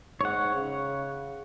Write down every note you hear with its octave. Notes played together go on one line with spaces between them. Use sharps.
G#2 C#5 F#5
C#3